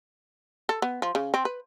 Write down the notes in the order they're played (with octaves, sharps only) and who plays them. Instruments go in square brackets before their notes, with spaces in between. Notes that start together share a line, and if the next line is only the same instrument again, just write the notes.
[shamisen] A4
B3
F3
C#3
C4
B4